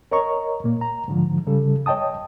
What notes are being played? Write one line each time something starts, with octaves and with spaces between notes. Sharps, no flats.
A#4 C#5 D#5 A#5 C#6
A#2 A#3
A#5
G#2 D3 F3
C#3 G3 A4
C#5 D#5 G5 A5 D#6